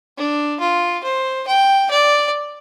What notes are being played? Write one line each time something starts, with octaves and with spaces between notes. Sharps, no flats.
D4
F4
C5
G5
D5